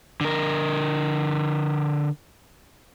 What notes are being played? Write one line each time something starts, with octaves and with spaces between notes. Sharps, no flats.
D3 A#4